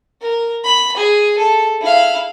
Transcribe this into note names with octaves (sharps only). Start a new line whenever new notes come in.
A#4
B5
G#4
A4
E4 F5